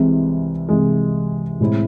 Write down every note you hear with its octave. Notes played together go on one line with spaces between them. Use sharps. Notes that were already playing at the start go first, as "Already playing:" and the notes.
Already playing: C2 C3 E3 G#3
C2 C3 E3 G#3
A2 G#3 C4 E4